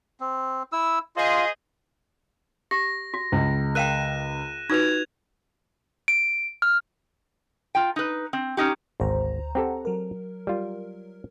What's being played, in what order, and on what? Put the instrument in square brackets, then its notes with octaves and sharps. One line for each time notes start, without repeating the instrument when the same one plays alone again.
[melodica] C4
E4 E6
[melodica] F4 [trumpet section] G#4 C5 D#5
[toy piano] G4 [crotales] A#6
[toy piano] F#4
[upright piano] C#2
[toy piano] A#4 F5 G5 [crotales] F#6 D#7 E7
[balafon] D#4 F#4 [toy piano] F4 B4 [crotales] G#6 F7
[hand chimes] D7
F6
[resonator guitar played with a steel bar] F4 G5
D#4 B4
C4
C#4 D#4 G4
[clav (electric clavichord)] G#1 [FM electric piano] D2 C5 A#5
[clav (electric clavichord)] C4 G4 A4 [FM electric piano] F#5 A#5
[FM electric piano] F#3 A#4
[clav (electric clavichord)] G3 F4